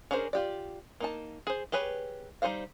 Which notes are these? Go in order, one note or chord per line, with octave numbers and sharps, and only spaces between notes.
C#4 D4 G#4 A#4 C5
F4 G4 D5
A#3 D#4 A5
G#4 C5
G4 G#4 B4 C#5
G3 D#4 F#4 C5 F5